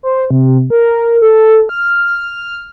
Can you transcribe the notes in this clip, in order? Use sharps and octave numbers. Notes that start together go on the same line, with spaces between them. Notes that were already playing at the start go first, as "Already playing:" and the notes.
C5
C3
A#4
A4
F6